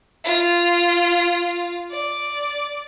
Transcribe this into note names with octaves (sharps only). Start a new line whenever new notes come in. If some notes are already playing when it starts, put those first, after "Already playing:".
F4
D5